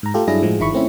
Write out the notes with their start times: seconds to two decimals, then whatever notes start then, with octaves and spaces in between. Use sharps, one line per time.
0.03 G#2 A#5
0.14 A3 F4 G4 A4
0.27 G2 F#3 D4 E4 G#4 A#6
0.42 A2 F3 G#3
0.59 G1 D#3 E4 B5 C#6
0.73 A3 C4 C#4 E4